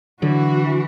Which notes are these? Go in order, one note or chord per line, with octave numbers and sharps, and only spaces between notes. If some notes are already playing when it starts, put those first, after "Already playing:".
D3 E3 F#3 F#4